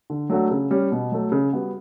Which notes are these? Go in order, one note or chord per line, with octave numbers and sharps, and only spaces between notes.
D3
F#3 A3 D4 F#4
C#3
G3 C#4
B2
F#3 A3
C#3
G3 B3 F#4